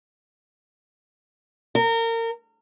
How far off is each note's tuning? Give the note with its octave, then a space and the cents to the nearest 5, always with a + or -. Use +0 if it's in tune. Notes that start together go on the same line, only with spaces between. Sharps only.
A#4 -30